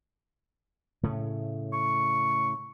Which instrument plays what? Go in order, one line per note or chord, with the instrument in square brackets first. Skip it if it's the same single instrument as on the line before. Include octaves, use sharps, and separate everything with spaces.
[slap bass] A2 C#3 A3
[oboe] C#6